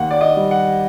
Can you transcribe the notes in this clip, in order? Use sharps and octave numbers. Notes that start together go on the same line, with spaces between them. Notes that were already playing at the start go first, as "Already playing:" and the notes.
Already playing: D#2 F#5
D5
D#5
G3
F#5